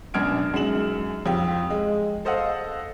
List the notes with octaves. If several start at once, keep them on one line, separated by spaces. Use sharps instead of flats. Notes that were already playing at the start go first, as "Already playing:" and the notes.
F#2 B2 D4 F6 G#6 D7
F#2 G#3 D#4 E7 F#7
F2 G4
G#3
A4 C5 D#5 F5 F#5 E6